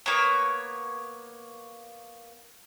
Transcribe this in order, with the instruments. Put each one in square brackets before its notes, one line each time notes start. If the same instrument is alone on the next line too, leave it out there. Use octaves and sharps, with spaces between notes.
[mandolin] A#3 B3 C#5